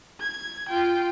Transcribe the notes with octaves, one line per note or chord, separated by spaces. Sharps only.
G#6
F4 G5